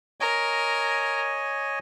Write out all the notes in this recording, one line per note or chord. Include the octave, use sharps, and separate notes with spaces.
A#4 C#5 D#5 G#5